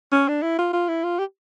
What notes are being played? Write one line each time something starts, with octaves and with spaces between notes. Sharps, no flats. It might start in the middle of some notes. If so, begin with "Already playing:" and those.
C#4
D4
E4
F4
F4
E4
F4
G4